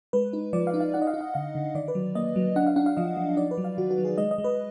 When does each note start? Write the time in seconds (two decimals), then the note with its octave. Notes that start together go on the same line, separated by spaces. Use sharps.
0.13 G#3 B4
0.33 D#4
0.53 F3 D5
0.67 F5
0.74 D#4
0.80 F5
0.94 D#4 F#5
1.02 D#5
1.07 F5
1.14 D#4
1.21 F5
1.34 D3 F5
1.55 D3
1.75 D#3 D5
1.88 B4
1.95 F#3
2.15 A#3 D#5
2.36 F#3
2.56 D4 F#5
2.67 F5
2.76 D4 F#5
2.86 F5
2.97 F3 D#5
3.17 F3
3.36 D#4 D5
3.51 B4
3.58 F#3
3.64 F5
3.78 D#3 F#4
3.91 F#4
3.98 F#3
4.05 G#4
4.18 G#3 D#5
4.31 D#5
4.38 G#3
4.44 B4